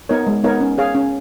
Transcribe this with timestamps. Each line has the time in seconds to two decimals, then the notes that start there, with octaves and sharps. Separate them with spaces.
0.09 B3 D#4 A#4 C#5
0.27 G#3
0.44 B3 D#4 A#4 C#5
0.61 C#4
0.78 G#4 C#5 F5
0.95 C#4